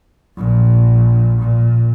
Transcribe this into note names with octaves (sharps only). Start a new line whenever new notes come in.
A#1 A#2
A#2